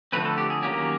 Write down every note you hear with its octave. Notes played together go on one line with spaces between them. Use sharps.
D3 F3 A3 C4 B4
A4
G4
G#4
D#3 F#3 A#3 C#4 G4